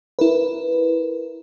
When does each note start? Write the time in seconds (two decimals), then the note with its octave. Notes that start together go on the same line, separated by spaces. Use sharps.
0.19 E4 A#4 B4